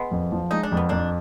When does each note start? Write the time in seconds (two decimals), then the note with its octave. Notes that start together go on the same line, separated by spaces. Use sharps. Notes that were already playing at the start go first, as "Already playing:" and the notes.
Already playing: G#3 B3
0.11 F2
0.32 F3
0.51 G#3 D#4
0.63 D4
0.72 F2
0.77 B3
0.89 F2 A#3 D4